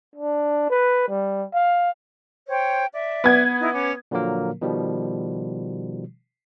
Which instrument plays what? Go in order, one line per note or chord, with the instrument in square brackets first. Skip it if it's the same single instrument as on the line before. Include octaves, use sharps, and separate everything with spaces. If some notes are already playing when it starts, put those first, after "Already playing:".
[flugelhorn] D4
B4
G3
F5
[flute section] C5 C#5 G5
D5 E5
[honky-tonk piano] B3 G#6
[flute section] D#4 E4
C#4 D6
[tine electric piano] A#2 D3 F3 F#3 A#3 A#4
B2 D#3 F3 G3